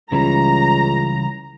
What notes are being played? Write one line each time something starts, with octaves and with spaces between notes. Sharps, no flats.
C#2 C#3 E3 G3 A#5